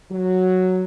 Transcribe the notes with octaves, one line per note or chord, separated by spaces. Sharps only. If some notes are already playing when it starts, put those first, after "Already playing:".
F#3